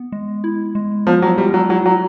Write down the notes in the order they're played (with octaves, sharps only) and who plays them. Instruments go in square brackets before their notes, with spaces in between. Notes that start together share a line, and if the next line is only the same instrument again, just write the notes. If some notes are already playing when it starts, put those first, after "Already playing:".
Already playing: [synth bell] B3
G#3
E4
G#3
[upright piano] F3 [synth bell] B3
[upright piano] F#3
[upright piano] G3 [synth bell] G#3
[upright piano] F#3
[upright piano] F#3 [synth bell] E4
[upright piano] F#3